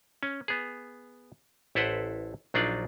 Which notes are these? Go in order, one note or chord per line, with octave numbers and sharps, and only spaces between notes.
C#4
B3 G#4
A1 E4 A4 B4 C5 F#5
A#1 F#3 D4 D#4 F4 D5